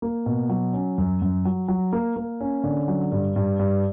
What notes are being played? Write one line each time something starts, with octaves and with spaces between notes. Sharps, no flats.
A#3
B2
F#3
C#4
F#2
F#2
F#3
F#3
A#3
A#3
C#4
D3
F#3
G2
G2
G2